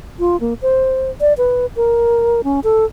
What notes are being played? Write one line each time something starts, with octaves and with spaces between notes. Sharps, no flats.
F4
A#3
C5
D5
B4
A#4
C#4
A4